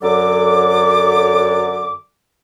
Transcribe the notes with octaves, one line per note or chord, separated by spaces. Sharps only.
F#2 D3 F#3 A4 D6